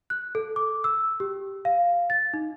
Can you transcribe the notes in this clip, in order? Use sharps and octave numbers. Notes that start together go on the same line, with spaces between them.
F#6
A4
D6
E6
G4
F5
A6
D#4